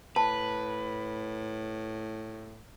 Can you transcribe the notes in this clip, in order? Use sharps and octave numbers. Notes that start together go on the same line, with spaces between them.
A2 B4 A5